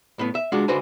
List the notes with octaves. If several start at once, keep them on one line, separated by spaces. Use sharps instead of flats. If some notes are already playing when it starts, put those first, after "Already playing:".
A2 B3
E5
G#3 D4 F4 F#4
C#2 D3 F#4 B4 C5 G#5